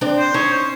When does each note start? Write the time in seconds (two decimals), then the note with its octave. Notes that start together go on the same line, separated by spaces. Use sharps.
0.01 C4 D4
0.18 C5
0.34 C#4 D#4 C#5
0.51 C5